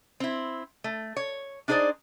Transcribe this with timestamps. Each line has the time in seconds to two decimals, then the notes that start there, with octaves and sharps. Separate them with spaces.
0.20 C4 E4
0.84 A3
1.16 C#5
1.68 D4 D#4 G#4 B4 C5 D5